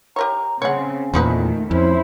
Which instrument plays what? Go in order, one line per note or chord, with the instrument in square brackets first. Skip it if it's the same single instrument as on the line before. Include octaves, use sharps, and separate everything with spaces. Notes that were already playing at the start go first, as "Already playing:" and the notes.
[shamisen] G4 A#4 C#5 [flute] A#5
[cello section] C#3 C4 [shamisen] C#5 F#5 [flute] G#5
[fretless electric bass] E2 A#2 [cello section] D#3 A3 [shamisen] F3 D#4 B4
[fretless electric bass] F2 [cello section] C#4 E4 [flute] C5